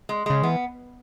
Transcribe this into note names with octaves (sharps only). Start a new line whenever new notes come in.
G#3
C#3 G#3
E3 B3